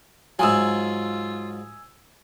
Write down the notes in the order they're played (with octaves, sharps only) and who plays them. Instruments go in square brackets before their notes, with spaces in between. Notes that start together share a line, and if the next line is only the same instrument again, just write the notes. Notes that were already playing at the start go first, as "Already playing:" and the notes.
[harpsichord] G#2 F#3 [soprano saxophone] F4 [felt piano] G#5 D#6 E6